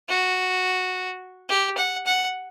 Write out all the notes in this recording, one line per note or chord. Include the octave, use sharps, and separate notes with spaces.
F#4
G4
F#5
F#5